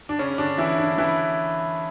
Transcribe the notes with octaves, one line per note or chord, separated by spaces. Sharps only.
D4
C#3 C#4
D3 D4
E3 E4
D3 D4
E3 E4